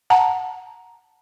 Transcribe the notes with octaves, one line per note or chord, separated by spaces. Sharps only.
F#5 A5 A#5